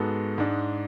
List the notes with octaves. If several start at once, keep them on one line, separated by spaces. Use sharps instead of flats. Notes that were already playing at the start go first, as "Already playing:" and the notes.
Already playing: G#2 G#3 B3 F#4 A4
G#2 G#3 D4